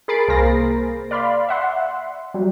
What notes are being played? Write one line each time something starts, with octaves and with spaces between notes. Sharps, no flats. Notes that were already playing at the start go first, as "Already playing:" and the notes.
G#4 A#4 B5 A6 C7 D7
C2 A#3 G#4 A#4 C5 A#6
D5 F5 B5 C6
E5 F#5 C6
F#3 G3